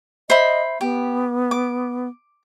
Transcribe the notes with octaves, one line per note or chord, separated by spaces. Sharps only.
C5 D#5 E5 B5
B3 G4
D6